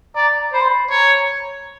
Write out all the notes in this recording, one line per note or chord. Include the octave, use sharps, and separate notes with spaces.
D5 A#5
C5 B5
C6
B5
C#5 A#5